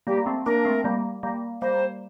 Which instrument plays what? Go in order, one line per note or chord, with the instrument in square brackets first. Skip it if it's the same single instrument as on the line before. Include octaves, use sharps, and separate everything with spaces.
[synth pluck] G3 A#3 [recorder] G4
[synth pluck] A#3
A3 C4
[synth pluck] A#3 D4 [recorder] A#4
[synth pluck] A3 C4
G3 A#3
G3 A#3
[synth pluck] G3 A#3 [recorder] C5